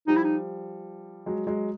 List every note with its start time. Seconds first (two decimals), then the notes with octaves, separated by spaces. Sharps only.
0.07 F3 G3 D#4
0.16 E4
0.24 D#4
1.26 F#3 G#3
1.47 F#3 G#3